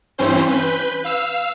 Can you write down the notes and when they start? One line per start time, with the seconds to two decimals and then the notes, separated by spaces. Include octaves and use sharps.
0.18 G2 E3 C4 C#4 C5 G6
0.48 B4 G6
1.04 F5 E6